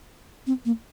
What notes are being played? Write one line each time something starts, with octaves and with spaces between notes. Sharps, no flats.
C4
A#3